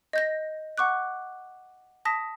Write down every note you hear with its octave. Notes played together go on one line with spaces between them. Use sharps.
D#5 G6 A#6
F#5 C#6 D6 F#6
A5 D#6 A#6 B6